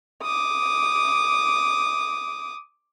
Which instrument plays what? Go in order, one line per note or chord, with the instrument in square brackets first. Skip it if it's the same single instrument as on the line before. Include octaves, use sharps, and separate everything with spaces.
[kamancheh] D6 D#6